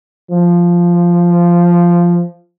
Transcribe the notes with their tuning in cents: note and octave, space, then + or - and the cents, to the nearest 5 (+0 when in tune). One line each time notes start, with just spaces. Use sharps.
F3 -5